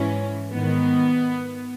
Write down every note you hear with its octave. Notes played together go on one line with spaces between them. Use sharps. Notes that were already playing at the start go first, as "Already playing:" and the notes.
Already playing: G#2 E3 C#4
G#2 D#3 B3